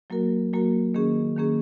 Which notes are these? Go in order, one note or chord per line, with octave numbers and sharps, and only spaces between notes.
F#3 A#3 F#4 A#4
F#3 A#3 F#4 A#4
D#3 A#3 C#4 G#4
D#3 A#3 C#4 G#4